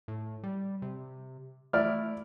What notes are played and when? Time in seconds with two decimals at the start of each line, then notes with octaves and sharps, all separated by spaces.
0.08 A2
0.43 G3
0.82 C3
1.73 A3 E4 D5 F6